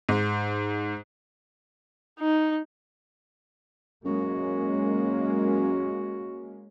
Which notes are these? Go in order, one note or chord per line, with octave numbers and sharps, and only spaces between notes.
G#2
D#4
F#2 G#3 A#3 C#4 F#4